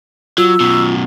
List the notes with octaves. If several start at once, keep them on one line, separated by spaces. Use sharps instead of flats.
F#3 F4 E6
F#2 B2